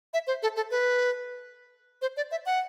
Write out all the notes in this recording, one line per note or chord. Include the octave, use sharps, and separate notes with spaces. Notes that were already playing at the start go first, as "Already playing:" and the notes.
E5
C5
A4
A4
B4
C5
D5
E5
F#5